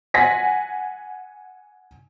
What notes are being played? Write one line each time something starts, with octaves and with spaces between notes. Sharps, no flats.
F#5 G#5 A#6 B6